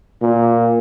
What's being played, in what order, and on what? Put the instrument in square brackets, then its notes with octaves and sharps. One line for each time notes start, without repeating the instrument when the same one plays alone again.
[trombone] A#2